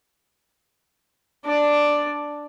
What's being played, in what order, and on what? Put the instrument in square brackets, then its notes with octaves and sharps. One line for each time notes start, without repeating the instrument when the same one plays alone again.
[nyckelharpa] D4 D5